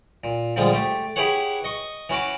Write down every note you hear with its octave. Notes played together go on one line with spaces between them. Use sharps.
A#2
A#2 D3 F3 G3 G#3
A3 G4
E4 G4 G#4 B4 C#5 F#5
D#5 C#6
E3 C#4 F#4 B5 D6